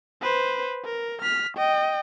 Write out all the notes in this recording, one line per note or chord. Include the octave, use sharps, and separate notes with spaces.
B4 C5
A#4
F6 B6
D#5 G5